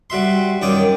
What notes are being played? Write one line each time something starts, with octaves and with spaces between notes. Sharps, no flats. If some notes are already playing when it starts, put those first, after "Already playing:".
G3 F#4 E5 C6
F#2 D#3 D5 G5 D6 D#6